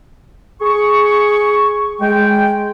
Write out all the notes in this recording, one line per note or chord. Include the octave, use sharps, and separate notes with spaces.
G#4 C#6
G#3 G5